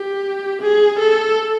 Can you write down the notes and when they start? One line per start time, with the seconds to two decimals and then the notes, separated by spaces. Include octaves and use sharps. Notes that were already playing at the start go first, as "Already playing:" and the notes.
Already playing: G4
0.62 G#4
0.99 A4